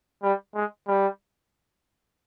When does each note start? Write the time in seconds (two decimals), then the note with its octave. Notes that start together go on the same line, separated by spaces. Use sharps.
0.23 G3
0.55 G#3
0.87 G3